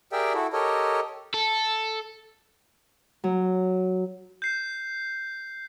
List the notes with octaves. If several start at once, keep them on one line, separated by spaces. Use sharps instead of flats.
G4 G#4 A#4 D5 E5 G5
E4 F#4 A4
G4 A4 A#4 C#5 D#5
A4
F#3
G6 C7